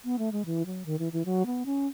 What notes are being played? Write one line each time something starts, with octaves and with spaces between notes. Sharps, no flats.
B3
A3
G#3
E3
F#3
D#3
E3
E3
F#3
B3
C#4